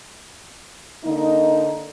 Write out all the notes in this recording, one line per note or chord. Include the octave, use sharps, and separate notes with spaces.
D3 A#3 D#4